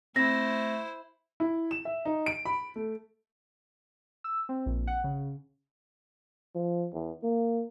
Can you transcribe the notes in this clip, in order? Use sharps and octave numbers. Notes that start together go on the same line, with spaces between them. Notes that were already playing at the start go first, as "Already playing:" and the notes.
A3 C4 E4 C5 A#6
E4
E7
E5
D#4
D7
B5
A3
E6
C4
A#1
F#5
C#3
F3
E2
A#3